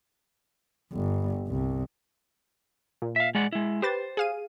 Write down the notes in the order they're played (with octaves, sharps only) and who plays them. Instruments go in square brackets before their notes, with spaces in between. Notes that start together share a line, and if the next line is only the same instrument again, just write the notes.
[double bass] G1
C2
[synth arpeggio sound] A#2
[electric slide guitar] E5 F5
G#3 D5 F#5
G#3 E4
[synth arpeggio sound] G4 B4 A6 [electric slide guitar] C5
[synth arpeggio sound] G#4 F5 D#7